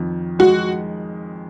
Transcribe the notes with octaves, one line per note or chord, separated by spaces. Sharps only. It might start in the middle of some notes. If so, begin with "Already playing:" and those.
Already playing: F2 D#3
G#3 F#4